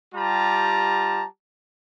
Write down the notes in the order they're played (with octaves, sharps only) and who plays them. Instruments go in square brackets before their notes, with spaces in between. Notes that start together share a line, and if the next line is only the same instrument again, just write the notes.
[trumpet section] G3 F4 G4 A5 A#5